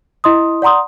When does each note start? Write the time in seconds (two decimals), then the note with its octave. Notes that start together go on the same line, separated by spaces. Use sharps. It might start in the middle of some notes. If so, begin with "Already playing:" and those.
0.24 E4 D#5 C6 D#6
0.62 D5 F#5 A#5 C6 D#6